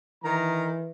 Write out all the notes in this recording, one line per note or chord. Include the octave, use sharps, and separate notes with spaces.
D#3 E3 A#5